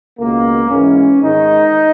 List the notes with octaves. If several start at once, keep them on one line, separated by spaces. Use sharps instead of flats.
C#2 B2 A#3
G#2 E3 C#4
G#2 D#3 D#4